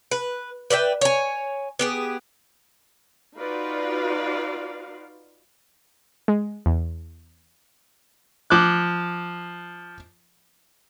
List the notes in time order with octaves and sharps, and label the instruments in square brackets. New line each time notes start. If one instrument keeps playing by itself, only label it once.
[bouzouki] B4
B4 D5 E5 G5
C#5 G#5
B3 G4 G#4
[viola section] D#4 F4 F#4 B4 D5 F5
[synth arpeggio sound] G#3
E2
[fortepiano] F3 D6 F#6